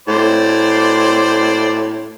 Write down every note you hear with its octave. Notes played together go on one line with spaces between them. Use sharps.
A2 C5 D5